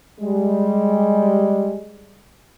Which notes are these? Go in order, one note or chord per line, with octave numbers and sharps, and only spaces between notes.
G3 G#3